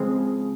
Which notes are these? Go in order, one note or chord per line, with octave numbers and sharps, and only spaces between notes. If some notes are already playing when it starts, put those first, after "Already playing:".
Already playing: C#3 F3 G#3 C4